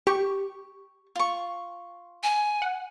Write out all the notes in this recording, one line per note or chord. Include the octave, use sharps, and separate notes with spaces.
G4 C#6
F4 C#6
G#5
F#5